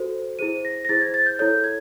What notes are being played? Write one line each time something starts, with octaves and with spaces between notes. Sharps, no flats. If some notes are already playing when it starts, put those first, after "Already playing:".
Already playing: F#4 A4 C5
E4 G#4 C5 D#7
A#6
A#6
E4 G#4 C5 A6
G#6
A6
G6
E4 A4 C#5 G6
G#6